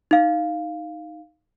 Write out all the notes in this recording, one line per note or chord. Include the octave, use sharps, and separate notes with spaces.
D#4 F5